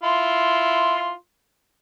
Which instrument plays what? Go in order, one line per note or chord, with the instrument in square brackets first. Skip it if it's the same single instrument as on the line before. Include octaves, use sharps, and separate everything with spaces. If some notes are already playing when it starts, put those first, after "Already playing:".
[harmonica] E4 F4 C6